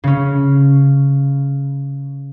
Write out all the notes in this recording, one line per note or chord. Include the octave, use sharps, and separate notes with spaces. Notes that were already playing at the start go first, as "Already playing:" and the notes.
C#3 C#4